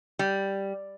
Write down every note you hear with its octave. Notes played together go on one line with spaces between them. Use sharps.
G3